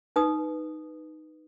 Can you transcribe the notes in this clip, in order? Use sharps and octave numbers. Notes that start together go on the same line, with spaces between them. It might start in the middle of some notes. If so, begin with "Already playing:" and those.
D#4 B4 D#6